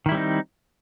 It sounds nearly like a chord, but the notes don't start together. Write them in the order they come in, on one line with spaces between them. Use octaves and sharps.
D#3 E4 G3 C4 D#4